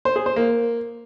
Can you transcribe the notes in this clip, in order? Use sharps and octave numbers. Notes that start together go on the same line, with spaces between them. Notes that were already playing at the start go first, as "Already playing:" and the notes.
C5
G#4
C5
A#3